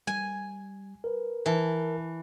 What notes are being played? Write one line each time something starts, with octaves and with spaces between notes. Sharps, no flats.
G3 G#5
A#4 B4
E3 A#4 E5 A5